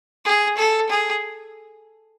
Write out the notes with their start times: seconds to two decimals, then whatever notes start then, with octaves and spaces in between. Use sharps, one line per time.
0.25 G#4
0.57 A4
0.89 G#4